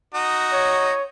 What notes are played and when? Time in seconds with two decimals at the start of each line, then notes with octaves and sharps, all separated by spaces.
0.14 D#4 F#4
0.53 C#5